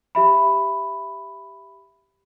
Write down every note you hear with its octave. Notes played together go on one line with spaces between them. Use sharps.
G4 E5 B5